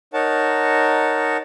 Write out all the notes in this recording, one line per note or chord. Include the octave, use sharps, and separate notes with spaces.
D#4 A#4 C#5 F#5 A5